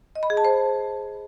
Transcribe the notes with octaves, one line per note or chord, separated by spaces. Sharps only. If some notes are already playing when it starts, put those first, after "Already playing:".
D#5
B5
G#4
A5
C5